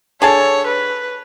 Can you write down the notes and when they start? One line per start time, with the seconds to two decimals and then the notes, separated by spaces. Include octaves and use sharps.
0.22 D3 G#4 A4 C#5 A5
0.67 B4